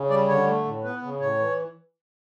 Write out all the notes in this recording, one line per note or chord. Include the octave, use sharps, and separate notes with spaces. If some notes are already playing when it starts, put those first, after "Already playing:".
Already playing: C#3
G3 D5
D3 C#5
A3
A2
B3 B4
C#3
A2 C#5
E3